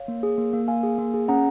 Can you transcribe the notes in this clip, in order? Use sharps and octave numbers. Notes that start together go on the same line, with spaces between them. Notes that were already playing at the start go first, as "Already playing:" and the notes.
Already playing: C#5 F5
A#3
G#4
A#3
A#3
A#3 F5 G#5
G#4
A#3
G#4
C#4 F#5 A#5